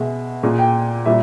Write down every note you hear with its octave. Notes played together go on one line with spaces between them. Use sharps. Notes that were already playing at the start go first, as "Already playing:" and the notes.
Already playing: B2 G#3 E5
A#2 G#3
G5
A#2 G3 E5